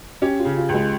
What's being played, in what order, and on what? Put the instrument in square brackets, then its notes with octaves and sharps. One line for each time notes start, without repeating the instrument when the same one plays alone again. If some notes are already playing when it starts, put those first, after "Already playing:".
[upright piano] C#4 [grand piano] G4
[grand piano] F4
[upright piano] C#3
[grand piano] F4
[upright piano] C#2 [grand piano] G#3